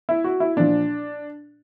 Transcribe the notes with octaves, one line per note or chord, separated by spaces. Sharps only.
E4
F#4
E4
A#2 F3 D4